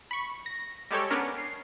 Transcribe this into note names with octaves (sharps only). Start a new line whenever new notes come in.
B5 C#6
A#6
G3 G#3 G4 A4 C#5
B3 C#4 D4 A#4
C7